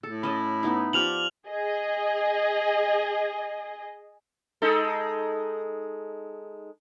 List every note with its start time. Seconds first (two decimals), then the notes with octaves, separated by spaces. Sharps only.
0.03 A2 A4
0.23 C#4 D#5 A5 B5
0.63 B3 D#4 E4
0.93 F3 G4 D5 F6 F7 F#7
1.48 G#4 D#5
4.62 G#3 D#4 A4